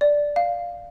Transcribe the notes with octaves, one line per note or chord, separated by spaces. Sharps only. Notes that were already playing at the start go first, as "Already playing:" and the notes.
D5
F5